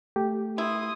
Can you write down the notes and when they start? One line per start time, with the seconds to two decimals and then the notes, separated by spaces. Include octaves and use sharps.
0.16 A3 G4
0.58 E4 C6 D#6